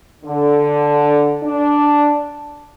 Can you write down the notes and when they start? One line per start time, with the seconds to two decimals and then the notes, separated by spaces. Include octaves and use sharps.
0.24 D3
1.43 D4